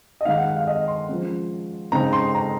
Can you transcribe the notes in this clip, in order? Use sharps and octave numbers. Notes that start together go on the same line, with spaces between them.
D#5
D#3 G#3 D#4 F5
F#5
F#5
F5
D#5
C6
F3 G#3 C#4
C#3 G#3 C4 D#4 A#5
C6
A#5